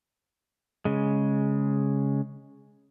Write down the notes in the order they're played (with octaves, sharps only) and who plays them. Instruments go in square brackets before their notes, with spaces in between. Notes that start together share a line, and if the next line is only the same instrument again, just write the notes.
[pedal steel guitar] C#3 G#3